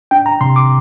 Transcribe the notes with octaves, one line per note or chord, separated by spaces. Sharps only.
D4 G5
A#5
C3 C6
D6